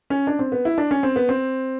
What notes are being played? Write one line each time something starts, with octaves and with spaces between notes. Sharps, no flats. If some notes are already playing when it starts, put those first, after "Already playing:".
C#4
D4
C4
B3
E4
D4
C#4
C4
B3
C4